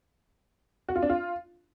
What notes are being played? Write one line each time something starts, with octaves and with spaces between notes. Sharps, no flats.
F#4
F4
D4
F4